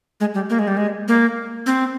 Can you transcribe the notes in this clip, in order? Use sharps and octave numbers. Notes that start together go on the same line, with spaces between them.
G#3
G3
A#3
G#3
G3
G#3
A#3
C4